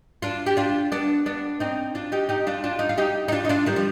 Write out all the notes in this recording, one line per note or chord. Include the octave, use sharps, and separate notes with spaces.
D4 F4
G4
D4 F4
B3 D4
B3 D4
C4 D#4
D4 F4
D#4 G4
D#4 G4
D4 F4
D4 F4
D#4
F4
D#4 G4
D#4
D4 F4
D#4
D4 F4
D#3 G3
F3